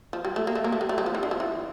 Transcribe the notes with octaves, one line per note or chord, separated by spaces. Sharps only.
F3
G3
A3
A#3
A3
A#3
A3
G3
A3
G3
F3
E3
D3
F3
E3